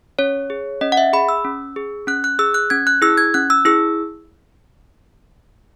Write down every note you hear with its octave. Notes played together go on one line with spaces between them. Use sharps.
C#4 C#5
G#4
C#4 D#5
F#5
E5
G#4 B5
E6
C#4
G#4
C#4 F#6
F#6
G#4 E6
F#6
C#4 G#6
F#6
E4 G#4 E6
G#6
C#4 F#6
E6
E4 G#4 E6